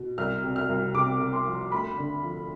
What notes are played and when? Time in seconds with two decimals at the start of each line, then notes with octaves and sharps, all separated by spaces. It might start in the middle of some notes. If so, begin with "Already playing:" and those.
Already playing: B2
0.18 C2 F6
0.44 C3
0.56 F6
0.69 C2
0.94 C3 D6
1.20 C3
1.33 C6
1.47 F3
1.72 D2 B5
1.98 D3
2.23 F3